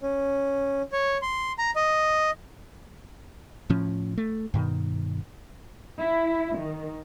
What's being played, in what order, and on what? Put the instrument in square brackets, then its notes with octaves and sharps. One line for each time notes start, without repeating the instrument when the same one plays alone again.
[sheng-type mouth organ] C#4
C#5
C6
A#5
D#5
[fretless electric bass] A2 F3 C#4
A3
G2 B2 D#3
[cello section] E4
D#3